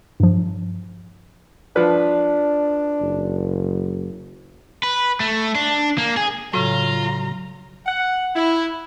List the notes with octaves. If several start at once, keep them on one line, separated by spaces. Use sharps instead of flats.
G2 F3
F3 D4 B4
F#1
B4
A3
D4
A#3
G#4
A2 C#3 F#3 F4 A#5
F#5
E4